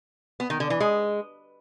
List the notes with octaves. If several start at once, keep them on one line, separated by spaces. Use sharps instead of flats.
B3
D#3
D3
E3
G#3